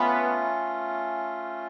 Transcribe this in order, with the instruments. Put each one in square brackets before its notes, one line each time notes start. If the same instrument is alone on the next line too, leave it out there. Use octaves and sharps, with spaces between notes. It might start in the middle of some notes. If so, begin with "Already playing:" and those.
Already playing: [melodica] A3 C#4 F4 [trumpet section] B3 B4